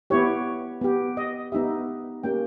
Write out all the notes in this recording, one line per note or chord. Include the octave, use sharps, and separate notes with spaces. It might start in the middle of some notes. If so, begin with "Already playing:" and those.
B3 E4 G4 C#5
B3 G4
D#5
B3 D#4 G4 E5
A#3 C#4 G4 G5